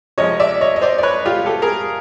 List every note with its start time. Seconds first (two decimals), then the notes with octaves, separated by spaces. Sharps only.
0.18 C3 F3 G#3 C#5 D#5
0.40 D5 E5
0.61 C#5 D#5
0.76 D#5
0.81 C5 D5
0.98 D5
1.03 B4 C#5
1.26 F4 G4
1.46 G4 A4
1.62 G#4 A#4